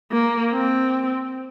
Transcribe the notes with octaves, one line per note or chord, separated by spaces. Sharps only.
A#3
C4